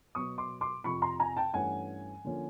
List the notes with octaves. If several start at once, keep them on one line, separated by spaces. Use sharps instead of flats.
B2 F#3 B3 C#6 D#6
C6 D6
C6 D6
F2 C3 F3 B5 C#6
A#5 C6
G#5 A#5
G5 A5
G2 E3 A3 C#4 F#5 G#5
D3 F3 A#3 C#4